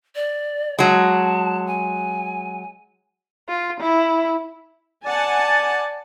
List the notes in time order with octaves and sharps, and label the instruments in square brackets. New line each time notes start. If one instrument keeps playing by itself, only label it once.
[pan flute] D5
[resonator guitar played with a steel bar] F#3 G#3 [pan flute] A5
[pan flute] G#5
[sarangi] F4
E4
[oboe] D5 [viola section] F#5 G#5 A5